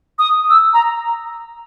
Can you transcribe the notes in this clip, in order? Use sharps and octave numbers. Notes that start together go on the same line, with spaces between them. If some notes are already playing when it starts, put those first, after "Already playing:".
D#6
E6
A#5